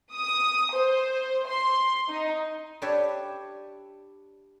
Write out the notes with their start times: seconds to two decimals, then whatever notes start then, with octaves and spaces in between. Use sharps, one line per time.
0.13 D#6
0.73 C5
1.48 C6
2.08 D#4
2.82 D4 G4 B4 C#5 D5 E5